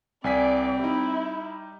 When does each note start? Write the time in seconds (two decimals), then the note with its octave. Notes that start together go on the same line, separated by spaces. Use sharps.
0.24 C2 C4 D5 G#5 B6
0.79 G3 D#4 E4